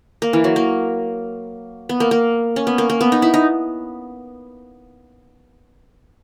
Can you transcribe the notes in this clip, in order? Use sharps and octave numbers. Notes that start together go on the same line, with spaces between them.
A#3
E3
F#3
A#3
B3
A#3
A#3
C#4
B3
A#3
A#3
B3
D#4
E4
D#4